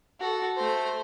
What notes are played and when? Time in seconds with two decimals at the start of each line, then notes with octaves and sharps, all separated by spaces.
0.20 F#4 A4
0.57 A3 C5